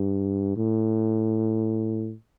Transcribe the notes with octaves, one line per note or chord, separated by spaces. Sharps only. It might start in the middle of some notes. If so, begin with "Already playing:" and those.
Already playing: G2
A2